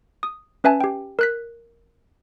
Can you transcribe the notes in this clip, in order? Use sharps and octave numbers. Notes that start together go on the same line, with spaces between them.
D#6
C#4 B4 E5 G#5 A5
G4 G5
A#4 F#6 B6